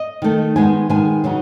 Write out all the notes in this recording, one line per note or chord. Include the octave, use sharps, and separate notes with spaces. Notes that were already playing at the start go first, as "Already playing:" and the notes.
Already playing: D#5
D#3 A3 D#4
D#3 G#3 B3 G#5
D#3 G#3 B3 G#5
C#3 F#3 B3 D#4